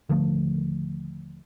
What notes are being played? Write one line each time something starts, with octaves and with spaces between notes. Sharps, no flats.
D#1 D3 F3 A3